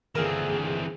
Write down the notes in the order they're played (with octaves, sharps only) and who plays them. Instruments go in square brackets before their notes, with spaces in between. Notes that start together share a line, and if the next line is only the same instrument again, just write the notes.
[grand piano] A#1 D3 [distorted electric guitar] E3 C4 [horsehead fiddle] G#4 [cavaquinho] A#4 E5 F5